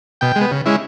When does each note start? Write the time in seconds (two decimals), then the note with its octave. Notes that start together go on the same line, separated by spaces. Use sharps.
0.21 B2 G5
0.36 G#3
0.41 B3
0.51 C#3
0.66 G#3 C#4 E4